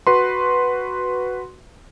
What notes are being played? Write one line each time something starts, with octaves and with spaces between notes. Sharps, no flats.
F#4 B4 C6